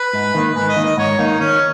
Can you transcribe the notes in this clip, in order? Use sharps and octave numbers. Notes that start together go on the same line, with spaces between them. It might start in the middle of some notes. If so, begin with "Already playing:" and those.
Already playing: B4
G#2
D#3 A#3
G#2 B4
D#5
D#3 A#3
D#5
G#2 C#5
D#3 A#3 D#4
D#3 C#4